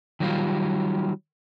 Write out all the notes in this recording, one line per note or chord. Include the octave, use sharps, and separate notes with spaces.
D#3 F#3 G3 F4